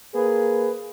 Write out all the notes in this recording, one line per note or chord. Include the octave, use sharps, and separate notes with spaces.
A#3 G#4 B4